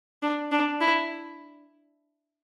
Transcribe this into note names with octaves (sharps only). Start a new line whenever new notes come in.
D4
D4
E4